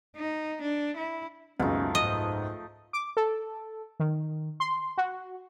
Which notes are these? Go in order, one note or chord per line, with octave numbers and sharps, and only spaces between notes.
D#4
D4
E4
C#2 F#2 B2 F3 A3 C#4 D#4
G#2 D#5
D6
A4
D#3
C6
F#4